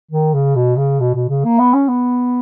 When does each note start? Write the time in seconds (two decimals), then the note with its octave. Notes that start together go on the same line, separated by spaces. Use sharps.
0.11 D#3
0.34 C#3
0.56 B2
0.78 C#3
1.00 B2
1.15 B2
1.29 C#3
1.45 A#3
1.59 B3
1.74 C#4
1.89 B3